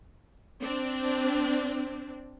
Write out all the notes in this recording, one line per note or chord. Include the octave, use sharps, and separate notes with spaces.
C4 D4